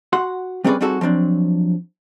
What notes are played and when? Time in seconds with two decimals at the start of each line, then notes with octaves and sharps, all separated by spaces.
0.13 F#4 F#5 C6
0.64 G3 C4 C#4 G#4 B4 D5
0.81 G3 C4 D#4 F#4 G#4 A4
1.01 F3 F#3 C4 D4